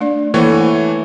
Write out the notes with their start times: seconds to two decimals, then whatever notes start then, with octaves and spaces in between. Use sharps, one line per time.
0.01 A3 D4 D5
0.34 E3 A3 A#3 C5 C#5 F#5